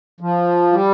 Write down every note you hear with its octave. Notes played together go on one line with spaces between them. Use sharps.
F3
G3